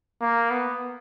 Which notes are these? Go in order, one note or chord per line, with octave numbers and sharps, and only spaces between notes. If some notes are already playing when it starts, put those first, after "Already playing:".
A#3
B3